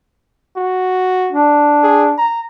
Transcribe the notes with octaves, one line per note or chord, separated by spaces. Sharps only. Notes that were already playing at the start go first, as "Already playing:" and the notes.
F#4
D4
G#4
A#5